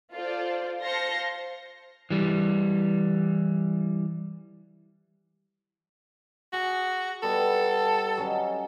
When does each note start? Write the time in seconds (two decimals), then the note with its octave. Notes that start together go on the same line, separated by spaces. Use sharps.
0.13 F4 A4 C5 D5
0.81 C5 F5 A5 C6 A#6 C#7
2.10 E3 G3
6.53 F#4 G#4
7.23 G3 B3 A4
8.17 F#3 C#4 D#5